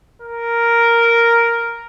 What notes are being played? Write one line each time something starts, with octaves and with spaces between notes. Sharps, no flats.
A#4